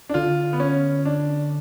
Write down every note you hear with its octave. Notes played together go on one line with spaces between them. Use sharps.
D4
D3 F4
B3
C#4
D4